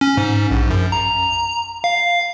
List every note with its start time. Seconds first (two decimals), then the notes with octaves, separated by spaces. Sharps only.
0.01 C#4
0.17 G#2
0.51 A#1
0.70 F#2
0.92 A#5
1.84 F5